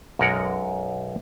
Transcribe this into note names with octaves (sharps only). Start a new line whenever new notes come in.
B1 F#2 G#3 A#4 F#5